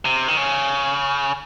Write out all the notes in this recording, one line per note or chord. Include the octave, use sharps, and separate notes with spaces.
C3
D#3
C#3